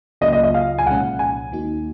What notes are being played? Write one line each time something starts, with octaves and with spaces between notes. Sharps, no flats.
C#2 C#3 F#3 A#3 F4 D#5
D#5
D#5
F5
G#5
C2 A#2 F3 G#3 C#4 F#5
G#5
D#2 D#3 A#3 D#4 F#4